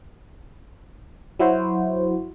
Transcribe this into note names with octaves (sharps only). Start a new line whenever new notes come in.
F#3 E4 F#4 C5